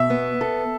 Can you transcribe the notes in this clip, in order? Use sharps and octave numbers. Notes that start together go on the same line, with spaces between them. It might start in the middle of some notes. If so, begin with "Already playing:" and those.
Already playing: B2 E5
B3
A4